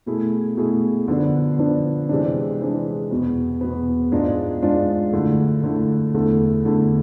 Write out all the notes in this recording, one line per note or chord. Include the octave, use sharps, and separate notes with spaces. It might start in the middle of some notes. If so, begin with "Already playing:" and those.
B2 A3 E4 G#4
B2 A3 E4 G#4
D3 F3 B3 D4
D3 F3 B3 D4
C3 E3 G#3 D4
C3 E3 G#3 D4
E2 B2 B3
E2 B2 B3
G#2 G#3 D4 F4 G#4
G#2 G#3 D4 F4 G#4
D3 A3 E4
D3 A3 E4
E2 D3 A3 E4 A4
E2 D3 A3 E4 A4